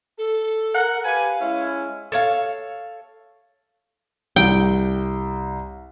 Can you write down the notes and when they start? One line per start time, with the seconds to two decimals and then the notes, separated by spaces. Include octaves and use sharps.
0.18 A4
0.75 A#4 F#5
1.05 G4 B4 F5 G#5
1.40 G#3 C#4 E4
2.12 A4 C#5 F5
4.36 C2 G5